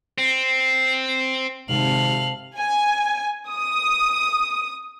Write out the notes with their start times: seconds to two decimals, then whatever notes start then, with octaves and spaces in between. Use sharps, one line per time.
0.18 C4
1.69 G#1 G#2 C3 A4 F5 F#7
2.57 G#5
3.50 D#6